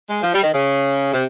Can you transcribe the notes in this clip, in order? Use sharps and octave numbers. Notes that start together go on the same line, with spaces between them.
G#3
F3
G3
D#3
C#3
C3